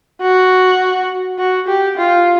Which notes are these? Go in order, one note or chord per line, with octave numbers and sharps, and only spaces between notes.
F#4
F#4
G4
F4